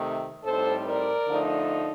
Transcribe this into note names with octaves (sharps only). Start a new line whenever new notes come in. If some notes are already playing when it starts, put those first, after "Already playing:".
Already playing: C3 D#3 A3
A2 G3 C4 D#4 A4 C5
A#4 D5
D3 F3 A3 D#4